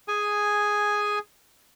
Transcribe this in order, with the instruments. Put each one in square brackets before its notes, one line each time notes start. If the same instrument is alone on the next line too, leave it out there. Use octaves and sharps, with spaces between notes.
[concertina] G#4 G#5